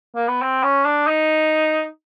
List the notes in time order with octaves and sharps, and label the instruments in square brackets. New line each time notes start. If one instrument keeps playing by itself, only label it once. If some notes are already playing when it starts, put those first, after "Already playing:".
[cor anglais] A#3
B3
C4
C#4
D4
D#4